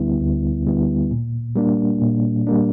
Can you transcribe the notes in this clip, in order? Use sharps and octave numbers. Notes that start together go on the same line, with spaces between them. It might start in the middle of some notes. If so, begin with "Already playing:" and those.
Already playing: D2 D3 G3 B3 E4
D2
D3 G3 B3 E4
A#2
G3 A#3 D4
A#2
G3 A#3 D4